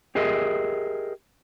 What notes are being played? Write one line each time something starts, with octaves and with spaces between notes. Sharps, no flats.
G4 G#4 A#4 D#5 E5